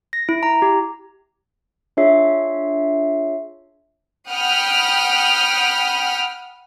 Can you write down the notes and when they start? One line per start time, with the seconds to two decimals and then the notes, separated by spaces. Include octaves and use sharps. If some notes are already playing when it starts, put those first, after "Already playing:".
0.13 A#6
0.29 E4
0.43 A#5
0.62 G4
1.97 D4 F4 G#4 C#5 E5 C7
4.29 F#5 G5 B5 D#6 F6